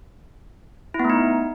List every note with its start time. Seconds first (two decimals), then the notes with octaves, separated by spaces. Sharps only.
0.94 E4
0.99 B3
1.05 A3
1.10 D#4